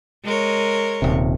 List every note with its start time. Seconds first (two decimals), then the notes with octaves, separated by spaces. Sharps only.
0.24 G#3 A#4 C#5
1.02 D#1 C3